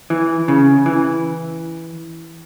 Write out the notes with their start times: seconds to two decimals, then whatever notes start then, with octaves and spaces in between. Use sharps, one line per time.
0.10 E3
0.48 C#3
0.86 E3